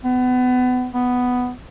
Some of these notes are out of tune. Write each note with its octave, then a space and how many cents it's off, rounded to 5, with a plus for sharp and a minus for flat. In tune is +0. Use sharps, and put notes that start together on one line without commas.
B3 +30
B3 +5